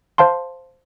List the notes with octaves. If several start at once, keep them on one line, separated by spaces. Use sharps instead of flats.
C5 F5 A5 C6